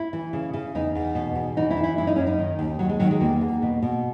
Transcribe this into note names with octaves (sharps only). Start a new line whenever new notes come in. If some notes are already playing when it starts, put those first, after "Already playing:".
Already playing: E4
E3
C#3
C#3
E2 D#4
E2
B2
E2
E3 D#4
E4
E3
E4
F#2 E4
D#4
F#2 C#4
D#4
D#3
D#2
D#2 F#3
G#3
D#3 F#3
G#3
E2 A#3
E2
B2
B2